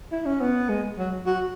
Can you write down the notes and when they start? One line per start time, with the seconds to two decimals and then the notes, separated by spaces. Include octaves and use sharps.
0.12 E4
0.26 C#4
0.41 B3
0.69 G#3
0.98 F#3
1.26 F#4